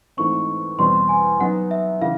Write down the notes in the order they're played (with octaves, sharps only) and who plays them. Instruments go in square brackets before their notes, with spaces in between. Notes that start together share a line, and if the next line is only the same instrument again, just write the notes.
[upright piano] G#2 E3 A3 C4 [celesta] C#6
[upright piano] E2 B2 G3 C4 [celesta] C6
[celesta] G#5
[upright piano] F#3 B3 D#4 [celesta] F#5
[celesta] E5
[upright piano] C#3 E3 [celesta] F5